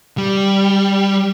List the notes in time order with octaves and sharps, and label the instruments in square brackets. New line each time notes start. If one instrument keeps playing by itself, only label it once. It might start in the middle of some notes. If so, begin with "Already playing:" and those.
[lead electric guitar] G3